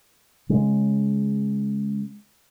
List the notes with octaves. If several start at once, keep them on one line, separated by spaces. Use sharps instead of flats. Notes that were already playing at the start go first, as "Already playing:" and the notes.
C#3 G#3